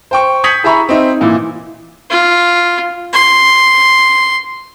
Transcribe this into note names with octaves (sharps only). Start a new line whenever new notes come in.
C5 G5 C#6
D#6 G6 G#6 B6 C#7 F#7
E4 G#4 E5 A#5 B5 C#6
C4 D#4 E5
A#2 E3 E4
F4
C6